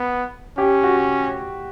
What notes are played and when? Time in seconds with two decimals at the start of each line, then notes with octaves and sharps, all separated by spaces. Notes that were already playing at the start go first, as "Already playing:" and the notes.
Already playing: B3
0.58 C#4 G4
0.83 F#4